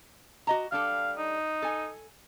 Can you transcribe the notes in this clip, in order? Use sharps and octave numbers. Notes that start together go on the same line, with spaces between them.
F#4 D#5 A#5
G3 D4 A4 F5
D#4
A4 G#5